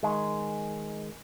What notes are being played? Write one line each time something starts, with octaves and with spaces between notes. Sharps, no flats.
D#3 G#3